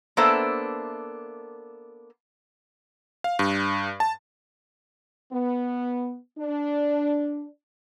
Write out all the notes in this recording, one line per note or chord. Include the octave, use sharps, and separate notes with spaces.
A#3 B3 D4 A4 C5 E5
F5
G2
A5
B3
D4